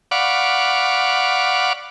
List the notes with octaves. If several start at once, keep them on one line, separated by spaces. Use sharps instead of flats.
D5 F5 F#5 B5 C#6 D6